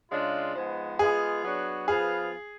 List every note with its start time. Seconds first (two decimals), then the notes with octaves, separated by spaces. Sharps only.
0.11 C#3 G#3 D4 F4
0.55 G#2 F3 G#3 B3
0.99 G#3 B3 F4 G#4
1.43 F#3 B3 D4 F#4 C#5
1.88 F3 B3 F4 G#4 B4 F5